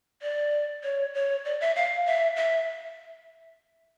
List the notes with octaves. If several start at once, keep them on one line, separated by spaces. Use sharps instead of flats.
D5
C#5
C#5
D5
E5
F5
E5
E5